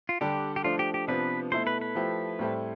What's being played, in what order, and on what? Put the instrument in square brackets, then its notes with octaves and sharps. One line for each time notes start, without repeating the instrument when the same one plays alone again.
[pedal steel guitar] F4
[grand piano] D3 G3 D4 A4 [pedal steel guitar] G4
[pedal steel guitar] G4
[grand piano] F3 A3 D4 [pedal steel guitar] F4
[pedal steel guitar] G4
G4
[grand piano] C3 F3 B3 D4 [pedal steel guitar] B4
[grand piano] B2 A3 E4 A4 [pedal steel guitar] C5
[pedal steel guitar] B4
B4
[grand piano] F3 A3 E4 G4
A2 G3 C4 E4 A4